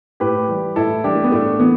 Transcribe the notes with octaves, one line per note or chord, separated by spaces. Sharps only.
A2 G4 B4
E3 G3
A2 E4 A4
E3 G3 D4 G4
A3
B3
A2 A3 D4
E3 B3